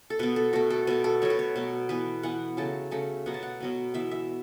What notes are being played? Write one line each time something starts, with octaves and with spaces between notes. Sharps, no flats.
A4
B2 B3 B4
A4
B2 A3 F#4
A4
B2 A3 B4
A4
B2 F#3 A3 C#5
B4
C#5
B2 F#3 A3
E3 B3 B4
E3 B3 F#5
C#3 F#3 A3 A5
C#3 F#3 A3
B2 F#3 B3 F#5
A5
F#5
B2 F#3 B3
E3 B3 E5
E5